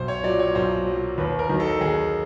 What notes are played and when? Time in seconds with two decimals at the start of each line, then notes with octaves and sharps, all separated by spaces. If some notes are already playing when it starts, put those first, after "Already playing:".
Already playing: B1 C5
0.08 C#5
0.23 A#2 F#3 D5
0.39 C#5
0.55 B1 C5
0.86 A#2 F#3
1.18 D#2 B4
1.39 A#4
1.49 D#3 F#3
1.60 A4
1.81 D#2 G#4